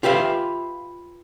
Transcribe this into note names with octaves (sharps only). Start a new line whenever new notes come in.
F4 G4 B4 E5 F5